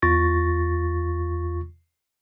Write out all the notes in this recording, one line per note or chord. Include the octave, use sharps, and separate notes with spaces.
E2 F4 C#6 A6 A#6